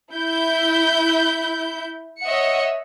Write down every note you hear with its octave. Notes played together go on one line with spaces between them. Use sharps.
E4 G6
C#5 D#5 E5 F#5 C#7